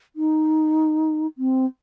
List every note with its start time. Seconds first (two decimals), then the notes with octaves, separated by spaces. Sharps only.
0.16 D#4
1.38 C4